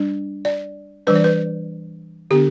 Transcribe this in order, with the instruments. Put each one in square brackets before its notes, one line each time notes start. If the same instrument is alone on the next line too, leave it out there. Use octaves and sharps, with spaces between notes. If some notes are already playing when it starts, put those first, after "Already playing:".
Already playing: [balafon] G3 D4
D5
E3 G3 D4 B4
D5
B4
D3 B3 D4 G4